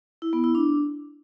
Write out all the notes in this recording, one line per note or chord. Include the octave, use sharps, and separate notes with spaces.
E4
B3
E4
D4